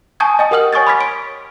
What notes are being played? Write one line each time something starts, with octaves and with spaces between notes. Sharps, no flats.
G#5 A5 C#6 D#6 G6 G#6
D#5 G5 D#6
G4 A#4 F#5 D#6 F6 F#7
C#5 G#5 C#6 D#6 G#6 A6
B5 C6 D6 F6 G#6 B6
D7